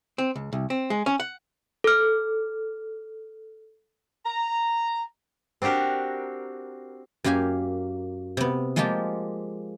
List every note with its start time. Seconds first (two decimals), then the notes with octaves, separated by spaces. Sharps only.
0.18 C4
0.35 C#2
0.53 C2
0.70 C4
0.90 G#3
1.06 C#4
1.20 F#5
1.84 A4 F6
4.26 A#5
5.62 C4 D4 F#4 G4 A#4
7.24 F#2 A#3 G4 F5 G#5
8.37 C3 B3
8.76 F3 G#3 A#3 F4 G4 A5